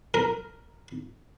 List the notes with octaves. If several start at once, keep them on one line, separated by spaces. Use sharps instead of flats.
A#4